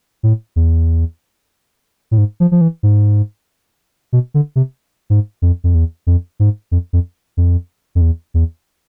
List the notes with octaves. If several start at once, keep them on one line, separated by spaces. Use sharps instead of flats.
A2
E2
A2
G#2
F3
F3
E3
G#2
B2
D3
C3
G#2
F2
F2
E2
F2
G#2
F2
F2
F2
F2
E2
E2